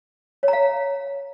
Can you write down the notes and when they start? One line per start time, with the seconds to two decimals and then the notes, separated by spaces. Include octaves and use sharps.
0.43 C#5
0.48 A#5
0.53 F5